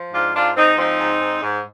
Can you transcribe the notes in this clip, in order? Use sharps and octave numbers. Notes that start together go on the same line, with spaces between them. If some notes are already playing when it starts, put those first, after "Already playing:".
Already playing: F3
G#2 D4 F4
G#2 D4 F4
G#2 C4 D#4
F3 C4 D#4
G#2
G#2
G#2